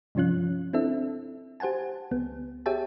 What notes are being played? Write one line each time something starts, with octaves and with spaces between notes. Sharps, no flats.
G2 C3 F3 C#4 F4 F#6
C4 D4 E4 A4 E5
G4 C5 F#5 G#5 A5
C#2 B3
G4 G#4 C#5 E5 G5 A5